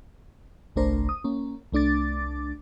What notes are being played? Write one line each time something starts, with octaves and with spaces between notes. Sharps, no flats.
G1 C2 A3 D4 A#4 C5
D#6
A#3 C#4
C2 A3 D4 D6 A6